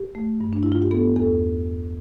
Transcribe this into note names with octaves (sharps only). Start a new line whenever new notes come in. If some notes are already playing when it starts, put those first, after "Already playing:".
Already playing: G4
A3
G2
D4
G2 E4
F4
G4
B3 A4
E2 A4